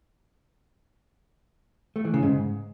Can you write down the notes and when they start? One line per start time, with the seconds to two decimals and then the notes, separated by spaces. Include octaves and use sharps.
1.96 A3
2.05 E3
2.14 C#3
2.23 G#2